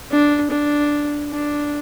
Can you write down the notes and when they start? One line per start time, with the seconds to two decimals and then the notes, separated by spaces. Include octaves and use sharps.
0.11 D4
0.51 D4
1.31 D4